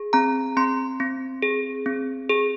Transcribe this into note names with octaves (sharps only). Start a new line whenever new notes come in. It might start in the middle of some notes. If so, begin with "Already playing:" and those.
Already playing: G#4
C4 A#5
C4 C6
C4
G#4
C4
G#4